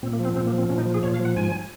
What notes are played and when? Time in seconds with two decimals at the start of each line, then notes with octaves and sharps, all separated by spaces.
0.03 A#2 C4
0.13 A#3
0.19 F3
0.25 C4
0.36 A#2 C4
0.47 A#3
0.53 F3
0.58 C4
0.69 A#2 C#4
0.78 D#4
0.86 F3
0.94 G#4
1.03 A#2 C#5
1.14 F5
1.20 F3
1.25 F#5
1.36 G#2 G#5